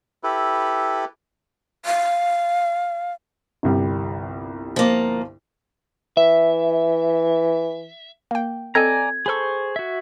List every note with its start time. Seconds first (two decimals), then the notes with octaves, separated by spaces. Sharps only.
0.23 E4 G4 A4 B4
1.86 F5
3.63 G1 C2 G3
4.76 F3 A#3
6.17 E3 E5
8.31 A#3 G5
8.75 C4 A4 D5 D#5 G#5 A#5 G#6
9.26 G#4 A4 C5 B5 C#6
9.76 F#4 E5